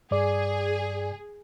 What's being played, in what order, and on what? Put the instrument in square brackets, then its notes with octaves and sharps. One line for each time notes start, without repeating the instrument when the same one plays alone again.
[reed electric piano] G2 D5 [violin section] G#4